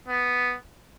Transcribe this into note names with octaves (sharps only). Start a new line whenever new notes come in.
B3